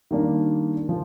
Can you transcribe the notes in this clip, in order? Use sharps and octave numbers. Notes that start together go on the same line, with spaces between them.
D#3 G3 A#3 D4
F3